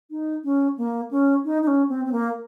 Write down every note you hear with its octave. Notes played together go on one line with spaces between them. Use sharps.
D#4
C#4
A#3
C#4
D#4
D#4
C#4
C4
C4
A#3